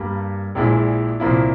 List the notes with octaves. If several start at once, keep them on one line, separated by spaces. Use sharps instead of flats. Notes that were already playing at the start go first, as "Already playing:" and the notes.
Already playing: G2 G3 A#3
A#1 A#2 G#3 E4
C2 A#2 F3 A#3 E4